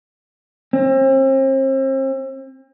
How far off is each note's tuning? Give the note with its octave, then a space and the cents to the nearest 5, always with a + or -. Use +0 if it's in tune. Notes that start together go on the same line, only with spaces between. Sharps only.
C4 +40